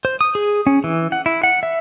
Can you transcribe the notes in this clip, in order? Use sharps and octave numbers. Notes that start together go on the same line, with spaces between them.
C5
D#6
G#4
C#4
E3
F#5
E4
F#5
E5